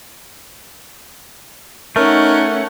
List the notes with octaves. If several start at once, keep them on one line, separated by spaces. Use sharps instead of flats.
A3 C#4 D#4 A#4 F#5